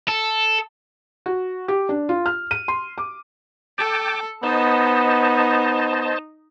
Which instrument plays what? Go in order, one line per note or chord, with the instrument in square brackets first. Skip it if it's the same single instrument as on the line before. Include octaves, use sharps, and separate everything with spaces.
[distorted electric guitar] A4
[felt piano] F#4
G4
D4
F4
F6
D#7
C6
D6
[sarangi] A4 [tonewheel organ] G5 A5 D6
[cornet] B3 [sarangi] D#4 [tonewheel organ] C5 D#5 A5